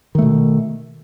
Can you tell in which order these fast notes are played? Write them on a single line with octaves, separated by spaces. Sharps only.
D#3 A3 B2